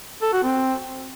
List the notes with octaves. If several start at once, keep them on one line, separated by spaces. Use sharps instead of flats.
A4
F#4
C4